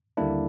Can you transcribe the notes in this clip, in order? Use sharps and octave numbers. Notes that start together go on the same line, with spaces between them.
D#2 D3 G3 A#3 D4 E4